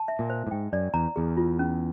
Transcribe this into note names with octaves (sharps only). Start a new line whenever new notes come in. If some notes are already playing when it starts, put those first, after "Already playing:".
Already playing: A5
E5
A#2
C5
A2
G#2 G5
F#2 D5
E2 A#5
E2 G#4
F4
C#4